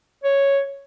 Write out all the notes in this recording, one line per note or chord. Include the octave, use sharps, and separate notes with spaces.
C#5